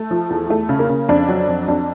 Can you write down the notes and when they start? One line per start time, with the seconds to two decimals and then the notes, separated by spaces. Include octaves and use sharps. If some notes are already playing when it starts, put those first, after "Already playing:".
Already playing: A3
0.11 F3
0.30 E2
0.49 E2 A3
0.69 C#3
0.79 A#3
0.89 C#3
1.09 F2 D4
1.29 F#3
1.48 F2
1.68 F2 D4